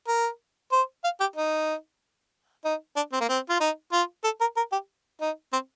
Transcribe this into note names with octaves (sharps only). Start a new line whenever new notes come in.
A#4
C5
F5
G4
D#4
D#4
D4
C4
A#3
C4
F4
D#4
F4
A4
A#4
A#4
G4
D#4
C4